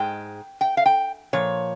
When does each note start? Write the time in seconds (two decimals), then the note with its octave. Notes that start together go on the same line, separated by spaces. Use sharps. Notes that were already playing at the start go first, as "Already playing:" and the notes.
Already playing: G#2 G#3 G5
0.61 G5
0.77 F5
0.86 G5
1.33 A#2 F3 C#5